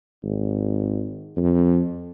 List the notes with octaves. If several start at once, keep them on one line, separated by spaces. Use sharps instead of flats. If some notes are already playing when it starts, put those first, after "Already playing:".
G#1
F2